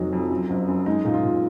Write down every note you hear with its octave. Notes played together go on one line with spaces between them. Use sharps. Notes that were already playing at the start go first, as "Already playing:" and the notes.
Already playing: F1 F#3 D#4
F2
F#2
F#1
F#2
G#3 D#4
A#2 D#4
F4
A#2